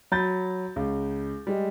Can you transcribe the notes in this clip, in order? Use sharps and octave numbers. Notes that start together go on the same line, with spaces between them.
F#3 B5 G6 A6
C#2
G3 G#3